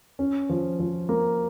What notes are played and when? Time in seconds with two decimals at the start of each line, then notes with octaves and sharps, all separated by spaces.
0.19 C#4
0.49 F3
0.79 F3
1.09 A#3